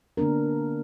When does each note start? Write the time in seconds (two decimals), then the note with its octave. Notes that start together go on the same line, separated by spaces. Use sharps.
0.17 D3 A#3 B3 D4 A#4